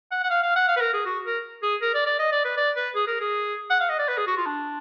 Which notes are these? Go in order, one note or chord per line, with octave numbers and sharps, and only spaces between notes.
F#5
F#5
F5
F5
F#5
F5
B4
A#4
G#4
F#4
A#4
G#4
A#4
D5
D5
D#5
D5
B4
D5
B4
G#4
A#4
G#4
F#5
F5
D#5
D5
B4
G#4
F#4
F4
D4